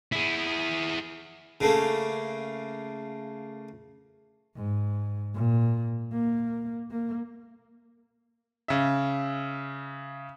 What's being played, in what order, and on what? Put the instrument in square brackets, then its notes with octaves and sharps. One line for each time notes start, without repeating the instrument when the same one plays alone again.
[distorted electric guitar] E4 G#4
[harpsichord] C#3 A3 A#3
[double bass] G#2
A#2
A#3
A#3
[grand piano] C#3 E5